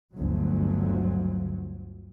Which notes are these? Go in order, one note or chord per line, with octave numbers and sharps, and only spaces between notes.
G1 D2 F3 F#3